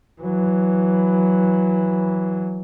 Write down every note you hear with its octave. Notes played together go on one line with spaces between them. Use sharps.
E3 F#3